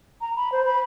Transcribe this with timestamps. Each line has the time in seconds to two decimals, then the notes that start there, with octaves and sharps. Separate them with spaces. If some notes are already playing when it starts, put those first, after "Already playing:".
0.21 A#5
0.36 B5
0.52 C5
0.66 B5